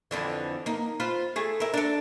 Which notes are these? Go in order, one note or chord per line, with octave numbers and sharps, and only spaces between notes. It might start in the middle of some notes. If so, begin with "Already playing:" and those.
F2 D3 E3
A#3 D#4
F4 B4 C5
A3 G#4
E4 A#4
D4 A4